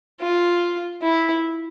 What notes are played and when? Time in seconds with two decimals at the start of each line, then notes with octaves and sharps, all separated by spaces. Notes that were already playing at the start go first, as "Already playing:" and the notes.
0.21 F4
1.02 E4